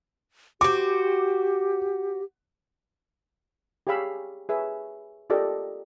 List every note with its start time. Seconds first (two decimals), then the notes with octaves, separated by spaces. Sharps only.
0.61 F#4 G4 C5 D6
3.87 G4 G#4 C#5 F5 B5 E6
4.49 G#4 B4 C#5 E5
5.30 F4 G4 A4 A#4 D5 D#5